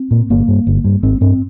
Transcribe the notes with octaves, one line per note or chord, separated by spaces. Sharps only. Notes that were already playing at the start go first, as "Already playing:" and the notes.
Already playing: C4
A#2
G1 A#3
G2
G1
G2
G#1 C4
G2 C4